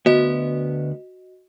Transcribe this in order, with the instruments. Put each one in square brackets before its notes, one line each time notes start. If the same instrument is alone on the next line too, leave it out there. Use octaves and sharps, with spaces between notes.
[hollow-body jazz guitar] D2 B3 [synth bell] F#4 D#5